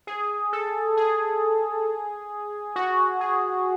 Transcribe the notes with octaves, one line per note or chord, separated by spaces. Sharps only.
G#4
A4
G#4
F#4
G#4